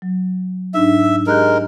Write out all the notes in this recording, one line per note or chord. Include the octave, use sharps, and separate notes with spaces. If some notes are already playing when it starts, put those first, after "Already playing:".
F#3
G#2 D4 D#4 E5
G#3 G4 A#4 F#6 G6